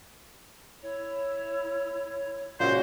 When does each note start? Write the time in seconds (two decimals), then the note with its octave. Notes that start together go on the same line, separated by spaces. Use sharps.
0.82 E4 C#5
2.60 A#2 C#3 G#3 F#4 C5